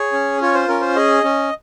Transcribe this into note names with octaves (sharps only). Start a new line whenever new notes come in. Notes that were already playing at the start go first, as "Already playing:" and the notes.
Already playing: G#4 C#5
C#4
F4 C#5
C5
C#4 A#4
C5
G#4 D#5
C#4